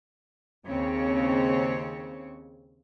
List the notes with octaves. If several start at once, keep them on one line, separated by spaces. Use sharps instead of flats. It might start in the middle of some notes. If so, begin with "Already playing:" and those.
D#2 C#3 C4 C#5